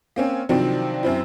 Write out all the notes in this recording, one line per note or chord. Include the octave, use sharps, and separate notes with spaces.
A#3 C4 C#4
C3 D#3 F3 F#3 C4 D4
F#2 C4 E4